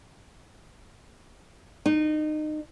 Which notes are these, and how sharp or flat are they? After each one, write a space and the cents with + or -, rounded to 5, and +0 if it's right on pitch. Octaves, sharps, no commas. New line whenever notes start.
D#4 -25